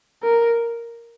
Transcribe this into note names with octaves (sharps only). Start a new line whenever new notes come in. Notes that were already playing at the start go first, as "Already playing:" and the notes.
A#4